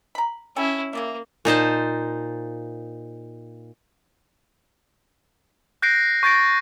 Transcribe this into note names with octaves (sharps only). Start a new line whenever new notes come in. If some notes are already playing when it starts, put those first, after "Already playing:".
A#5 B5
C#4 E4 A4 G5 G#5
C#3 A#3 D5 E5
A#2 D#4 C5 A5
F#6 G6 A#6 C7 D7
C#6 G6 A6 A#6 D7